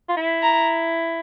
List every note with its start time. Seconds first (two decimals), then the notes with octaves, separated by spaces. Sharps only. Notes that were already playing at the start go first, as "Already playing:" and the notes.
0.09 F4
0.17 E4
0.42 A#5